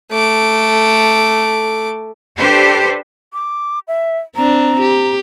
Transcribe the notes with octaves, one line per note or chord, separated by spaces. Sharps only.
A3 D6
D4 G4 A4 B4 C5
D6
E5
C4 D4 A#5
G4